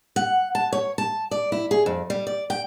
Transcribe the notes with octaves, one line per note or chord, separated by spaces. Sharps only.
F#5
A5
C#5
A5
D5
E4
G#4
F2
G3
D5
G5